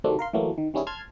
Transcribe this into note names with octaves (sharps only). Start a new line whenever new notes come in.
C3 D#3 F#3 A3 C4 D4
A#4 F5 C6
E3 F#3 A3 A#3
D#3
D#3 G3 C#4 E4 G#4
A5 C6 F6 G#6